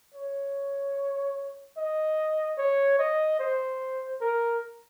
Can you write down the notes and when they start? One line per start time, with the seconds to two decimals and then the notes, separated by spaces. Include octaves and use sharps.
0.14 C#5
1.77 D#5
2.58 C#5
2.99 D#5
3.39 C5
4.21 A#4